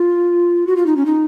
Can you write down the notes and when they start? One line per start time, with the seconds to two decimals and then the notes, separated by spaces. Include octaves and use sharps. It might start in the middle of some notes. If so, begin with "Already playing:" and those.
Already playing: F4
0.67 F#4
0.77 F4
0.86 D#4
0.97 C#4
1.06 D#4